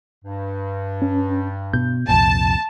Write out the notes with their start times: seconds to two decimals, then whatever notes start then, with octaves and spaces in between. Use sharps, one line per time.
0.25 G2
1.02 C#4
1.73 B2 G6
2.09 C2 F2 A#2 A5